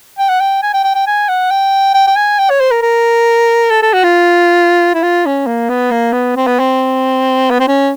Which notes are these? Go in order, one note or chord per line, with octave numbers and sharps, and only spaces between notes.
G5
F#5
G5
G#5
G5
G5
G5
G#5
F#5
G5
G5
G5
G#5
G5
C#5
C5
A#4
A#4
A4
A4
F#4
F4
E4
F4
C#4
A#3
B3
A#3
B3
C4
B3
C4
B3
C4
C#4